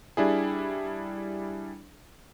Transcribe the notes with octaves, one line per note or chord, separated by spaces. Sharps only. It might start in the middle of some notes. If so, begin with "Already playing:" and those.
G3 D4 E4 G#4